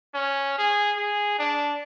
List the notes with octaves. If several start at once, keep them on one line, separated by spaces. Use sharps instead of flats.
C#4
G#4
G#4
D4